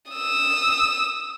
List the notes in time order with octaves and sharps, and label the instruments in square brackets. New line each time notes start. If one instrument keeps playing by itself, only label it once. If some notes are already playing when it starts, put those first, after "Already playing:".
[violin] D#6 E6